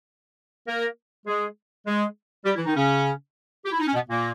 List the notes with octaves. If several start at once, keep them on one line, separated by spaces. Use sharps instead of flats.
A#3 A#4
G#3 G#4
G#3 G#4
G3 G4
E3 E4
D#3 D#4
C#3 C#4
G4
E4
D#4
C#4
B2 B3
A#2 A#3